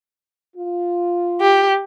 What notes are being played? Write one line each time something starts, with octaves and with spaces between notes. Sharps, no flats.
F4
G4